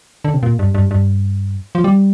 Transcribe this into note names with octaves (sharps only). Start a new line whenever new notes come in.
D3
C3
A#2
G2
G2
G2
F3
G3